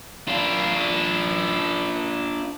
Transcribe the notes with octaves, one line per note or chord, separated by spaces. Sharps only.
D4 F4